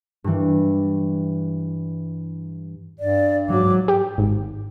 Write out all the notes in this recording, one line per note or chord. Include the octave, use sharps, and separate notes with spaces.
G2 E3
G2 D5
G#2 F#3 D6
G4
G#1